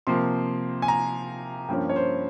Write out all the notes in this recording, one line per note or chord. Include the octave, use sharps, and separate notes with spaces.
C3 F3 A#3 C6
G#5
A#5
G2 F3 A#3 C#4 G5
C#5
C5